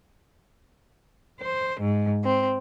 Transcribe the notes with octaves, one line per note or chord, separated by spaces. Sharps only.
C5
G#2
C4